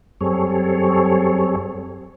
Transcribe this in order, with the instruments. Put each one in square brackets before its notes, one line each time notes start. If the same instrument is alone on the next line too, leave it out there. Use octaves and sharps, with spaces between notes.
[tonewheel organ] F#2 G3 C4 G#4 A4 C#5